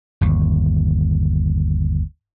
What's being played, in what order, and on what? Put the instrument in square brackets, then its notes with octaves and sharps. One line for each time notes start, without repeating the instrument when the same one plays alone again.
[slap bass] G1 D#2